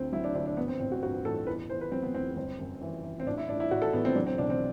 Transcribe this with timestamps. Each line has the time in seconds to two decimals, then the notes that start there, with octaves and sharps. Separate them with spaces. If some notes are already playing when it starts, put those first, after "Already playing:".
Already playing: D2 D3 C4
0.12 F#3 E4
0.24 D4
0.35 D2 D4
0.46 D4
0.57 G2 B3
0.68 C4
0.80 A1 C4
0.92 F#4
1.02 G2 F#4
1.25 A1 A4
1.47 E2 B4
1.70 E2 C5
1.81 B4
1.92 F#3 C4
2.02 B3
2.14 E2 C4
2.36 G1 C4
2.59 F#2
2.81 E3
3.04 E3
3.20 C4
3.26 A1 D4
3.38 E4
3.49 A1 D4
3.60 E4
3.71 A1 F#4
3.82 A4
3.93 A1 B3
4.05 C4
4.16 F#3 D4
4.27 C4
4.38 B1 D4
4.50 C4